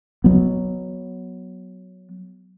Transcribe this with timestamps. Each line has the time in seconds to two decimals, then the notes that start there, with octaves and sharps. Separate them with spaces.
0.24 F#3 B3